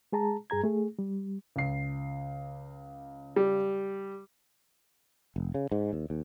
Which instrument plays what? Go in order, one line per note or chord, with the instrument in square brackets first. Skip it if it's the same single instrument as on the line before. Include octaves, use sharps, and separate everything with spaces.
[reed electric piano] G#3 G#4 A5 A#5
G2 G#4 A#5 G#6
A3 G#4
G3
[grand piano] C#2 C7
[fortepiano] G3
[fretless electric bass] F1
C#3
G#2
D#2
D#2